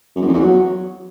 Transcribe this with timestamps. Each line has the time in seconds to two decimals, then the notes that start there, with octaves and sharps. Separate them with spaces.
0.16 F#2
0.22 E2
0.28 F2
0.34 E2
0.40 F#3